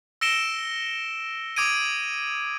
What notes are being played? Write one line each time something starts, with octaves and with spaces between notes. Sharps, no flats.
E6 A#6 C#7 D7 E7 G7
D6 D#6 G#6 D7 D#7